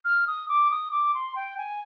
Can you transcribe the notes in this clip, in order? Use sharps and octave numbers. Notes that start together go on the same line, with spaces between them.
F6
D#6
D6
D#6
D6
C6
G5
G#5